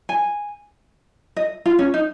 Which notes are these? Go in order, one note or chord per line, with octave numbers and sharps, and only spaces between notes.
G#5
D#5
F4
C#4
D#4